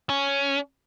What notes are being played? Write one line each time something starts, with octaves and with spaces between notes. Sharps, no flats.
C#4